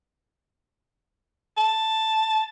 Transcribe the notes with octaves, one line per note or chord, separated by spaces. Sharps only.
A5